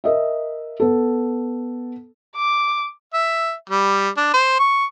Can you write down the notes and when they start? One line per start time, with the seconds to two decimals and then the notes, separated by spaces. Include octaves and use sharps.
0.04 A#4 D#5 E5
0.80 B3 A4
2.36 D6
3.14 E5
3.70 G3
4.17 D4
4.33 C5
4.59 C#6